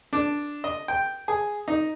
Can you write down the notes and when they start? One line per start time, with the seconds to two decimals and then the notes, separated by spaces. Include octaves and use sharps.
0.13 D4
0.64 D#5
0.88 G5
1.28 G#4
1.68 D#4